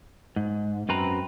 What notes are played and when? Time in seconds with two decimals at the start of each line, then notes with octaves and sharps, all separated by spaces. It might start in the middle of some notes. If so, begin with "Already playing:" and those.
0.36 G#2
0.89 F#2 C4 B4 A#5